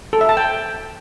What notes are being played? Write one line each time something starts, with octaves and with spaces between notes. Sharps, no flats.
A4
E5
A5
G5